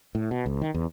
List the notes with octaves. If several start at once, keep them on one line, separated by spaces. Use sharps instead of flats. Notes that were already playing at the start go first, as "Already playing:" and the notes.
A2
B2
C#2
D#3
E2